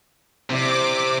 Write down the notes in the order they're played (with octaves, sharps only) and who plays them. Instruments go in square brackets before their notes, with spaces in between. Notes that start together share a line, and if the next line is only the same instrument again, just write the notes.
[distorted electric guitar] C3 [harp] C4 E4 D5 [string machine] D6